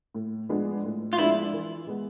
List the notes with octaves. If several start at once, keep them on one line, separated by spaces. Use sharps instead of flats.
A2
F3 G#3 B3 D4
A2
F4
F3 G#3 B3 D4 E4
E3
G#3 B3